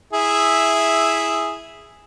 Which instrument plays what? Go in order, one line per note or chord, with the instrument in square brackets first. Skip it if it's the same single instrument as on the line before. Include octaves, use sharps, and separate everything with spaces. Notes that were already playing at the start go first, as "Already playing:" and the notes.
[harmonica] E4 G#4 E5